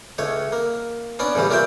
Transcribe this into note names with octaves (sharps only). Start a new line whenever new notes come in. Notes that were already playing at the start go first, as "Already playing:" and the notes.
C#2 A3 C#5
A#3
B3 C#4 D4 D5
A2 C#3 E3 G3
A#3 C#4 F4 D5 E5 G5